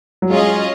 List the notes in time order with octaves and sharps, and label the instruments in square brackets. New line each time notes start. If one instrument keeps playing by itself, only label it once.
[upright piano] F#3
[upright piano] G#3 [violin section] C#4 F4 G#4 D#5